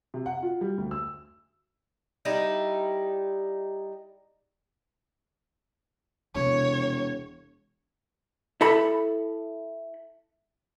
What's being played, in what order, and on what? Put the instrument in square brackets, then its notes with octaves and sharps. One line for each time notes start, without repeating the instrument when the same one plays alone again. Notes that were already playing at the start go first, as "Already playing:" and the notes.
[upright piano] C3
F#5
F4
G3
D2
E6
[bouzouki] G3 D#4 E4
[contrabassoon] E1 [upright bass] C3 F3 [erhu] C#5
[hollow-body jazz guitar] E4 A4 B5